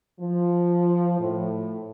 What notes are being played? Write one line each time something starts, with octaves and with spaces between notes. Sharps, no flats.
F3
A2